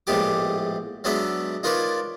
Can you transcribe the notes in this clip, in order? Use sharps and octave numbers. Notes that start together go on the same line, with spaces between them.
A#1 A2 G#3 B3 G4 D6
F#3 G#3 B3 C#4 D4 E5
D#4 F4 A#4 B4 C#5 D5